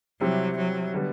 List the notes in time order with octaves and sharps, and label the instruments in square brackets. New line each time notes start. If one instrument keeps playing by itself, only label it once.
[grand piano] C3 G3 C4 E4 [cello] F#3
[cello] F#3
[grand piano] D3 G3 B3